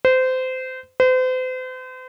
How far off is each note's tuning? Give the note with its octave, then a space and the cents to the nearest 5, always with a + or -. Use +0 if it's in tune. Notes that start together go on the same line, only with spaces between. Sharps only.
C5 -25
C5 -40